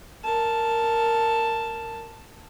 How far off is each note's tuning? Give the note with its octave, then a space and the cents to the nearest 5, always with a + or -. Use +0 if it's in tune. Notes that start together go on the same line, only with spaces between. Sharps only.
A#4 -10 A5 +0